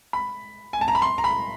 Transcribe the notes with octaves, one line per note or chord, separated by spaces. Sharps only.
B5
G#5
A5
A#5
B5
C6
A#5
B5